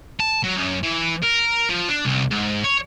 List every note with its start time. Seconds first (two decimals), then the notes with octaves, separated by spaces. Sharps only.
0.20 A5
0.44 F#3
0.55 F#2
0.83 E3
1.22 A#4
1.69 F3
1.89 D4
2.05 C2
2.31 G#2
2.64 C#5